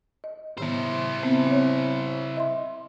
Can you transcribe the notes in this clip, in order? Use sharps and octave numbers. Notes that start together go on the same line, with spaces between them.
D#5
A2 D#3 B3 E4 C5
B3 C4
C4 C#5
D#5 E5 C6